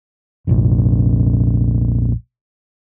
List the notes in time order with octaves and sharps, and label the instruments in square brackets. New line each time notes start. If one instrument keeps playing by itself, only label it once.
[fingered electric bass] F1 A#1